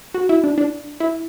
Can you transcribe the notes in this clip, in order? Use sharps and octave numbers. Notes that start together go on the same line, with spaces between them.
F#4
E4
D4
D4
E4